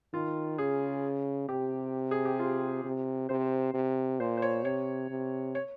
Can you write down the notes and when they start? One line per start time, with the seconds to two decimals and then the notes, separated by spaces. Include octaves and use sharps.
0.13 D#3 F4
0.58 C#3 G#4
1.49 C3 G4
2.11 G#4
2.25 G4
2.39 F4
2.84 C3
3.29 C3 C5
3.74 C3
4.20 A#2 C5
4.37 C5
4.42 C#5
4.64 C3 C#5
5.10 C3
5.55 C#5